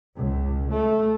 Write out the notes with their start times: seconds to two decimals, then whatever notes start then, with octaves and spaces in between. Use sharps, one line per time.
0.17 C#2
0.71 A3